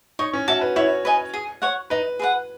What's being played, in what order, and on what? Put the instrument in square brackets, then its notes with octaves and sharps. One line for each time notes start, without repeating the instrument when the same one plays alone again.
[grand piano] D#4 [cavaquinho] C#5
[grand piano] C#4
[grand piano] F#4 [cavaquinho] E5 A5
[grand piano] B4
[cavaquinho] E4 [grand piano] C#5
[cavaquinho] B4 D#5 G#5
G#4
C#5 F#5
[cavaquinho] D#4 [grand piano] B4
[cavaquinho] G#4 B4 F#5